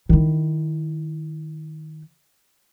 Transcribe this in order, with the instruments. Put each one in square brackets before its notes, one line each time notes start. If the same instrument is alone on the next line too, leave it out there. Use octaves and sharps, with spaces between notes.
[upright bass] D#3 E4